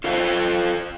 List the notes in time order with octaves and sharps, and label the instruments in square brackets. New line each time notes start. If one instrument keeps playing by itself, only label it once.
[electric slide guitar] F4 A4 C5 F5